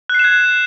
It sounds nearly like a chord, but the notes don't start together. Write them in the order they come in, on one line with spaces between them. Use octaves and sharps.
F#6 C7 E7 G#6